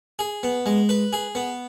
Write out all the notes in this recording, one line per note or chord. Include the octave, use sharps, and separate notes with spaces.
G#4
B3
G#3
B4
G#4
B3